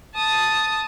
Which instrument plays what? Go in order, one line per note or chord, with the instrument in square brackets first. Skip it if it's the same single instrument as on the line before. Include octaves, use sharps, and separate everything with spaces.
[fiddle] A5 D#6